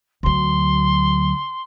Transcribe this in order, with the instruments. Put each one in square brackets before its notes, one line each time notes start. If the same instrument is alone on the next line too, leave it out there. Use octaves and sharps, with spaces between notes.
[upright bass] D2 F#3 [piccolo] C6